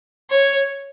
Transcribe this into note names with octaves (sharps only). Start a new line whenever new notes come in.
C#5